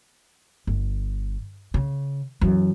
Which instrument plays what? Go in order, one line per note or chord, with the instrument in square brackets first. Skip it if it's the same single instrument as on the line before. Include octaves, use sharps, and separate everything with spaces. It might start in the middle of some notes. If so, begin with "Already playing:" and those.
[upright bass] G1
C#3
F#2 E3